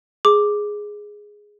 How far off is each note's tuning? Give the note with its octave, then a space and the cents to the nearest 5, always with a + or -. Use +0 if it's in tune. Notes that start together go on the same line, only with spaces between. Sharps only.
G#4 +0 D6 +0